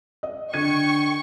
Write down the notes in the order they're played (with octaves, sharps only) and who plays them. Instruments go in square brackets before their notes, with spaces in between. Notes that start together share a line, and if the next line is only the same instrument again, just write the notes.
[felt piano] D#5
[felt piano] D3 G#6 D#7 [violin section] G5 C#6 C#7